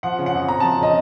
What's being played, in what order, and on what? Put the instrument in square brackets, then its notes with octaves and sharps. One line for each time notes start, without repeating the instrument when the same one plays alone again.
[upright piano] F3 F#5
C#3
F#5
F2
F2 A#5
F3 A5
C#3 D#5